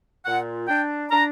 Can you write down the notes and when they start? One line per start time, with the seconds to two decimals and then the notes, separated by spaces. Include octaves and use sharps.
0.25 A#2 F#5
0.67 D4 G5
1.10 D4 A#5